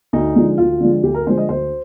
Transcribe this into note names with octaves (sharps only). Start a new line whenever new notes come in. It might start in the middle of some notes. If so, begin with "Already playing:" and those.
D2 D#4
D3 F3 G#3
D2 F4
D3 F3 G#3
D2 G4
A#4
D3 F3 G#3 C5
D#5
D2 C5